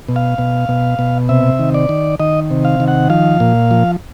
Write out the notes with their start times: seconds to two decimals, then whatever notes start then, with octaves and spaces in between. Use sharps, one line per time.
0.08 B2
0.16 F5
0.38 B2
0.69 B2
0.99 B2
1.29 C3 E5
1.59 D#3
1.74 D5
1.89 D#3
2.20 D#3 D#5
2.50 C3
2.65 F5
2.80 D#3
2.88 F#5
3.10 F3 F5
3.40 A#2
3.71 F3